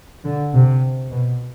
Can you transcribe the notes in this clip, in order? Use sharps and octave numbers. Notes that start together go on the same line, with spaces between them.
D3
C3
B2